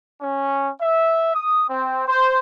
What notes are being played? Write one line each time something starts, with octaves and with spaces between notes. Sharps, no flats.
C#4
E5
D#6
C4
C5